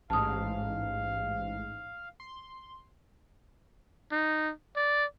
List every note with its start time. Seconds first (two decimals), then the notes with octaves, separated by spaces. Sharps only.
0.10 A1 G#2 F5 A5 D#6
2.20 C6
4.12 D#4
4.76 D5